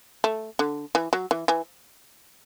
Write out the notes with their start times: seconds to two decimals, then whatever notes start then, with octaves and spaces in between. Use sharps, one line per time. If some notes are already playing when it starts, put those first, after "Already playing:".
0.24 A3
0.59 D3
0.95 E3
1.13 F#3
1.31 E3
1.48 E3